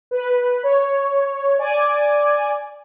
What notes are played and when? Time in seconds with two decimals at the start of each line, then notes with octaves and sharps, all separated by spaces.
0.11 B4
0.63 C#5
1.58 D5 G#5